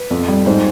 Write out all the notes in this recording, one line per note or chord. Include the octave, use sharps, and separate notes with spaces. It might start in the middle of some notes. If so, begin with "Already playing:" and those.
Already playing: B4
F2
G3
G#2 C5